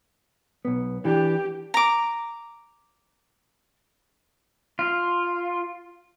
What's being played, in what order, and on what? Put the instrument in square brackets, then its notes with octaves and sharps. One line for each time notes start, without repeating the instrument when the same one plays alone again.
[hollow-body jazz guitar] B1 B3
[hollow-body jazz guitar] E3 D4 [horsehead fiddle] G4
[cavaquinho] A#5 D6
[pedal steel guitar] F4